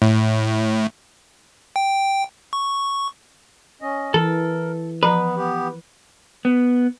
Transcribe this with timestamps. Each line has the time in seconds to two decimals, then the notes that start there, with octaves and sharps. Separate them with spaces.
0.02 A2
1.76 G5
2.53 C#6
3.82 C#4 D#5
4.14 E3 A4 A#4
5.03 F3 B3 B4 A#5
5.37 B3 G4
6.45 B3